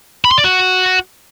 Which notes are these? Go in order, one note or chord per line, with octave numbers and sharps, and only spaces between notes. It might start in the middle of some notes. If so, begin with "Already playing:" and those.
B5
C6
D5
F#4